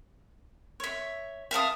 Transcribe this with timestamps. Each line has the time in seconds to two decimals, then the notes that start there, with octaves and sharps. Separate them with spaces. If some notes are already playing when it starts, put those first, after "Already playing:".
0.80 C#5 E5
1.51 E5 F5 A5 D#6